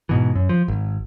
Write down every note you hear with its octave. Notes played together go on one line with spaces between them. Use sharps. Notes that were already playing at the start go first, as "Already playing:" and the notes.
G#2 B2 E3
F#2
F3
G#1